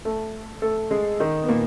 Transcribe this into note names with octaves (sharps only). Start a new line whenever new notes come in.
A3 A4
A3 A4
G#3 G#4
D#3 D#4
B3
A#2 A#3